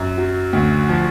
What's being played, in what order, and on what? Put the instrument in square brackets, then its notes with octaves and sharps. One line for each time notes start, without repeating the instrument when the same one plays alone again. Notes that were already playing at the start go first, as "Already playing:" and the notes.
Already playing: [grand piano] F#2
F#3
D2
F3